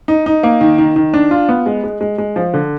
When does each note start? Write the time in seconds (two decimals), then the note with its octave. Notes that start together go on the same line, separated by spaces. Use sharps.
0.08 D#4
0.26 D#4
0.43 A#3
0.61 D#3
0.78 D#3
0.96 D#3
1.14 D4
1.31 F4
1.49 B3
1.66 G#3
1.84 G#3
2.01 G#3
2.18 G#3
2.36 F3
2.54 D3